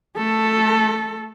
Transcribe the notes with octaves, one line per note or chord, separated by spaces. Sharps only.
A3 A4